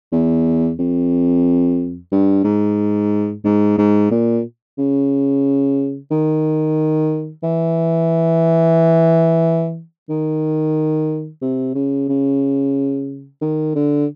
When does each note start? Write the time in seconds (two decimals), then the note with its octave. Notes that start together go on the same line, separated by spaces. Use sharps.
0.12 E2
0.79 F2
2.12 G2
2.44 G#2
3.45 G#2
3.78 G#2
4.11 A#2
4.78 C#3
6.11 D#3
7.43 E3
10.09 D#3
11.42 C3
11.75 C#3
12.09 C#3
13.41 D#3
13.75 D3